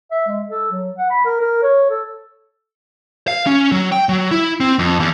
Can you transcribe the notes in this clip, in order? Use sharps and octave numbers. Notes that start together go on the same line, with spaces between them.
E5
G#3
A4
F#3
F#5
B5
A#4
A#4
C#5
A4
F5
C#4
F#3
G5
F#3
E4
C4
F2
E2